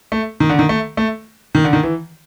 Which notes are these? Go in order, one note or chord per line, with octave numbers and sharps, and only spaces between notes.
A3
D#3
D3
D#3
A3
A3
D#3
D3
D#3
E3